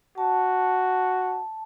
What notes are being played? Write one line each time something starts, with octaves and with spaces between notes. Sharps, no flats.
F#4 A5